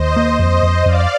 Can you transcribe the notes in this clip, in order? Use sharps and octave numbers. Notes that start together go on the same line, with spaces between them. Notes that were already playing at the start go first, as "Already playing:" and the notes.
Already playing: D#2 C5 D#5
A#3
F2 C5 D#5
F2
F2 D5 F5